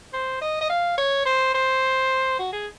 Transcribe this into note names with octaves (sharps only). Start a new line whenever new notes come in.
C5
D#5
D#5
F5
C#5
C5
C5
F#4
G#4